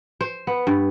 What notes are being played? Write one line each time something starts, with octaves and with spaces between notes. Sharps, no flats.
C5
B3
G2